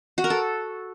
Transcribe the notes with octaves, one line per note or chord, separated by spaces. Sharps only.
F#4
A#4
A4